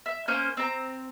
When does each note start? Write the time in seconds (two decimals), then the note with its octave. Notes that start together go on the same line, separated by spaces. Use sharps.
0.06 E5
0.28 A#3 C#4 C5 G6
0.57 C4 A#5